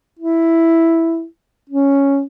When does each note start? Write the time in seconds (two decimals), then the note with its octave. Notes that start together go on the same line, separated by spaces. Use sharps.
0.19 E4
1.69 C#4